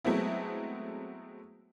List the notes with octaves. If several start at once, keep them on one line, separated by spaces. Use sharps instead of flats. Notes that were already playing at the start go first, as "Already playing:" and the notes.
F#3 G#3 A3 B3 C4 E4